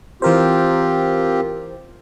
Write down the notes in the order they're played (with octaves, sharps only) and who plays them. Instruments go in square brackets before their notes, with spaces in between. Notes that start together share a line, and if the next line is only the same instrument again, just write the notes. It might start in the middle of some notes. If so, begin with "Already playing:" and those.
[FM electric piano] E3 A#4 C5 [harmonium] C4 F4 G4